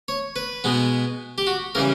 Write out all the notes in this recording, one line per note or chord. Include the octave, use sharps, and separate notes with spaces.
C#5
B4
B2 G#3 B3
G4
F#4
C#3 E3 G3 A#4